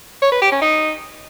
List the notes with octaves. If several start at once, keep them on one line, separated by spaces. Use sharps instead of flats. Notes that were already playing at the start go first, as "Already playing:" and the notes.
C#5
B4
G4
C#4
D#4